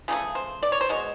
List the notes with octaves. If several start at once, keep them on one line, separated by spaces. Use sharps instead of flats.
C#3 F3 A3 G#4
C5
D5
C#5
C5
B2 G#3 C#5